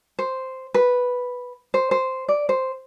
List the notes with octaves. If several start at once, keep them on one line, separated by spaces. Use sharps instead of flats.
C5
B4
C5
C5
D5
C5